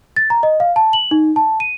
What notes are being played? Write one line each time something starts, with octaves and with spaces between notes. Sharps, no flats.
A6
A#5
D#5
F5
A5
F#7
D#4
A5
D#7